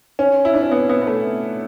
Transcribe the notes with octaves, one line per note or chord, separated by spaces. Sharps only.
C#4
E4
D4
C#4
B3
B3
B3
A3